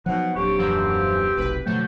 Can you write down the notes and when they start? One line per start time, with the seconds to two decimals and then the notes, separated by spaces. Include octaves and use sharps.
0.06 B2 F3 F#3 D#4 F#5
0.36 D#1 F2 F#3 D4 G4 C#6
0.58 F#2 E3 F3 C4
1.37 F1 B1 B4
1.66 B2 D3 F3 F#3 A3 G5